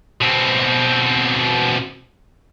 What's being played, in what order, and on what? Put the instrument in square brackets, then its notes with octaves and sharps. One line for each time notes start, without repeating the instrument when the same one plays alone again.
[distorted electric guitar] B2 C4